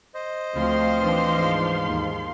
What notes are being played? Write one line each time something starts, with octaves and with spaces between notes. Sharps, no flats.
C5 D#5
D2 F3 C4 F5 C6
E3 D4
G#2
D#2